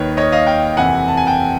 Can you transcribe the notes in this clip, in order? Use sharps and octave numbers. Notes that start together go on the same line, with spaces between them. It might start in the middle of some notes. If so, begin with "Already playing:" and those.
Already playing: D#2 D#3 B4 C#5
C#5 D#5
D#5 F5
F5 G5
F2 C3 E3 F#5 G#5
A5
G#5
G5 A5